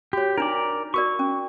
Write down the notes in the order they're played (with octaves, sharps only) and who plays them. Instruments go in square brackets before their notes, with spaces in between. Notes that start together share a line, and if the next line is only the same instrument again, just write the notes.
[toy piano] F#4 C#5 [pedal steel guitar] G4
[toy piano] D4 D#4 [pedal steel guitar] A#4 D5
[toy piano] F#4 A#4 D5 [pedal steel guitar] C#6
[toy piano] C#4